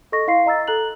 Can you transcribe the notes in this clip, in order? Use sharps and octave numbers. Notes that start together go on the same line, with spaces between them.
A4 D#5 C#6 A#6
E4 F5 C6 C7
D#5 A#5 E6 A6
A4 A#5 F#6 F#7